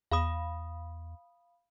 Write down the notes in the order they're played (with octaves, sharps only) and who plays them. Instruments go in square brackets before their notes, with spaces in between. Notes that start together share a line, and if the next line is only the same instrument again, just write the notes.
[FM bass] E2 [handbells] F5 B5 D#6